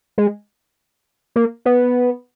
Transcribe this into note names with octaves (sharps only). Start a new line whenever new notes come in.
G#3
A#3
B3